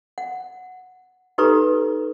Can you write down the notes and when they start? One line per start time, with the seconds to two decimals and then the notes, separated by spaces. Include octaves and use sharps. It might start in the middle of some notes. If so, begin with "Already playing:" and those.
0.18 F#5
1.38 D#4 G4 A4 B4 A#5 C#6